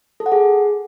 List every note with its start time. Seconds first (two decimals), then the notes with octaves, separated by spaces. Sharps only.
0.20 A4
0.26 F#5
0.32 G#4